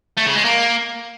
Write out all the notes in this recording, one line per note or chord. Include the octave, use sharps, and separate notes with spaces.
A3
C#3
G#3
A#3